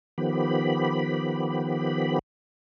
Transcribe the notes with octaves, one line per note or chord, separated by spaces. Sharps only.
D#3 F3 B3 G4 B5